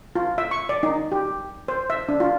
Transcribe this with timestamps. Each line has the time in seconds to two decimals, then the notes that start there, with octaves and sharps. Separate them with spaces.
0.15 F4
0.38 E5
0.51 C#6
0.69 D5
0.83 D#4
1.12 G4
1.68 C5
1.90 E5
2.09 D4
2.20 F4